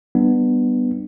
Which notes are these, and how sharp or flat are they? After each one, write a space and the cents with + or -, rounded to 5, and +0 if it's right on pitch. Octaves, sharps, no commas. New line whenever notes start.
G3 +0 B3 +0 D4 +30